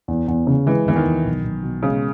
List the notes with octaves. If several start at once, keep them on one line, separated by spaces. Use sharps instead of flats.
E2
E2
C#3
E3 G#3
E2 E3
D#3
E2
B1
B1
B2
C#3 G#3